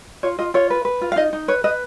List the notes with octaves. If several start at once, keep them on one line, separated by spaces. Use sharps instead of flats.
F4 C#5
F4 D#5
F4 C#5
B4
B4
F4
F5
D#4 D#5
D#4
B4 C#5
B4 D#5